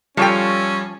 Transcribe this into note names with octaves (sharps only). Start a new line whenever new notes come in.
F3 G3 C#4 F4 A4 C#5 G5